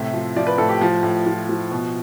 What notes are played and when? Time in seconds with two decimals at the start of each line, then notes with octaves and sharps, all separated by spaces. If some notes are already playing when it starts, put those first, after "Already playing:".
Already playing: A2 C3 E5
0.14 F3
0.36 F3 D5
0.47 B4
0.58 A2 A4
0.69 G4
0.81 F3
1.03 A2
1.27 F3
1.49 F3
1.71 B2